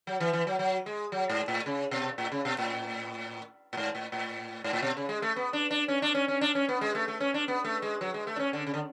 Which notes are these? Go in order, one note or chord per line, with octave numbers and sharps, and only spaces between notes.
F#3
E3
E3
F#3
F#3
G#3
F#3
G#2
A2
C#3
B2
A2
C#3
B2
A2
A2
G#2
A2
A2
G#2
A2
B2
C#3
G#3
A3
B3
D4
D4
C#4
D4
C#4
C#4
D4
C#4
B3
G#3
A3
A3
C#4
D4
B3
A3
G#3
F#3
G#3
A3
D4
C#4
D3
C#3
D3